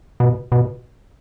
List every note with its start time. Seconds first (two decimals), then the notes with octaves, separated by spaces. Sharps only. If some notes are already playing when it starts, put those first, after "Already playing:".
0.20 B2
0.52 B2